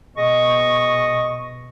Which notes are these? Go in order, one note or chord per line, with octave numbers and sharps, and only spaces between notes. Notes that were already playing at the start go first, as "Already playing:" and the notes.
B2 G#3 D#5 C#6